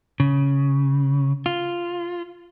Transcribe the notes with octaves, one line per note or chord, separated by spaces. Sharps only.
C#3
F4